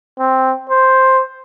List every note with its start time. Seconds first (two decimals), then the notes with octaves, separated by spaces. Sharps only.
0.19 C4
0.70 C5